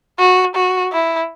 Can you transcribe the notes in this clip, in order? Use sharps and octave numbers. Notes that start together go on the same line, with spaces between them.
F#4
F#4
E4